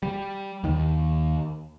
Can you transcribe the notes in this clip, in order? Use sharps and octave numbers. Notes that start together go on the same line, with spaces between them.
G3
D#2 D#3